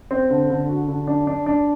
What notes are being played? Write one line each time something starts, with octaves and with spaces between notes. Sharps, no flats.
C4
D3
D3
F#4
D3
D4
D4
D4